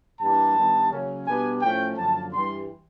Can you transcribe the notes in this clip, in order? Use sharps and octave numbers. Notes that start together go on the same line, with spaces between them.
G2 E3 G3 A#3 D4 A5
G2 D#3 G3 B3
C#3 F#3 A#3 C#4
B2 G3 B3 D4 G#5
A2 F3 A3 C#4 G5
F#2 D3 F3 A#3 A5
G2 E3 G3 C6